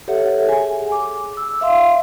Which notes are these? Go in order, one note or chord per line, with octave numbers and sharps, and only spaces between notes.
G4 A4 C#5 E5 F#5
G#4 G#5
D6
E6
E5 F5 C6